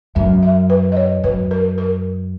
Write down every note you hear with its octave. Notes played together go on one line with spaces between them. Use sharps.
F#2 E5
E5
B4
D#5
C#5
F#2 B4
A#4
A#4